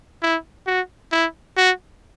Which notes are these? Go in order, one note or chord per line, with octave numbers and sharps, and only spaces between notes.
E4
F#4
E4
F#4